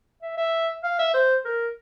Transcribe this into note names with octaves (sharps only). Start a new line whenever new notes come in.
E5
E5
F5
E5
C5
A#4